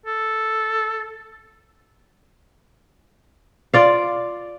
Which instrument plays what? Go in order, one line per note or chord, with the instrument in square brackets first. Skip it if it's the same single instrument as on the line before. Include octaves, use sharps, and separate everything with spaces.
[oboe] A4
[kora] F4 D5 F5